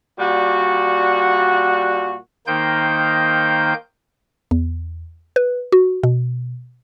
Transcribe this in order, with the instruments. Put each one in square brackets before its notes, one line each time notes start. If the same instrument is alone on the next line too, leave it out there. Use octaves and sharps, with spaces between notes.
[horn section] A#2 G3 F#4
[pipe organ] D#3 A#3 D#4 C5 G5 G6
[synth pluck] E2
B4
F#4
B2